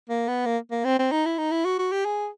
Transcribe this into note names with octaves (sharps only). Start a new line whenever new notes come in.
A#3
B3
A#3
A#3
C4
C4
D#4
E4
D#4
E4
F#4
F#4
G4
G#4